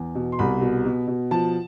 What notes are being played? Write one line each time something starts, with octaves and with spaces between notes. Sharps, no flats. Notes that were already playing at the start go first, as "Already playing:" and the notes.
Already playing: E2
B2
C6
C2 B5
B2
B2
B2
F3 A5